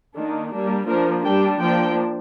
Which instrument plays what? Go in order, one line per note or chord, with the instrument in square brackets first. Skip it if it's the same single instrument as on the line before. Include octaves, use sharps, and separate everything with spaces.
[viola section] D#3 A#3 D4
G3 A#3 D4
F3 A#3 D4 A#4
G3 D4 G5
F3 A#3 D4 G5